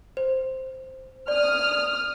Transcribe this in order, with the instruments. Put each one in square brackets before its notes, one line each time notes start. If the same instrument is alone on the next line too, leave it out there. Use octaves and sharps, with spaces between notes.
[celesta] C5
[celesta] D5 [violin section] D#6 F6